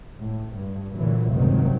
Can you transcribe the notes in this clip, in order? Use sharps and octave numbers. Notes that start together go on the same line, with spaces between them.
A2
G2
A#2 D3 E3 F#3
F1 C#2 G2 C3 D#3 F#3